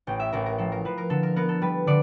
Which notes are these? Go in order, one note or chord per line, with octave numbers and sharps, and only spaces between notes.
A1 G5
E5
A1 A#4
A#4
F3 A4
A#4
F3 B4
A#4
D3 A4
A#4
B3 A#4
A4
G3 B4
D3 D5